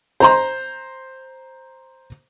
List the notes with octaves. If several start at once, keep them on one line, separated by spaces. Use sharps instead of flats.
C5 A#5 C6